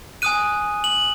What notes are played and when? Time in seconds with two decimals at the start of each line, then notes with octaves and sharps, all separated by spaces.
0.22 G#5 D#6 F#6 D#7
0.84 F#7